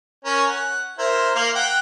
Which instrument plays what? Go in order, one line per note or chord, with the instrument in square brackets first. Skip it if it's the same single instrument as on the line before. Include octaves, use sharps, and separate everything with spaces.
[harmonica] C#4 A#4
F#5
E4 A#4 C5
A#3 F5
F#5 G5